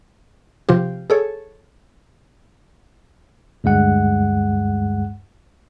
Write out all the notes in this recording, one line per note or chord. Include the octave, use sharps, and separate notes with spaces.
C3 F3 F4 G4
G#4 A4 C#5
D2 G2 G#3 F#5